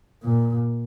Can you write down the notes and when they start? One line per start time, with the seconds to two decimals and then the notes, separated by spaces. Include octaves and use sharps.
0.23 A#2